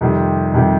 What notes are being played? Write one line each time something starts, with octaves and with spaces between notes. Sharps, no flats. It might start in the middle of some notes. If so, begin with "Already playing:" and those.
F2 C3 D#3 G3
F2 C3 D#3 G3